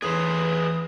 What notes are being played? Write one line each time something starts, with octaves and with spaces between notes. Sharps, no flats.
E2 A2 G#4 B4 C5 D#6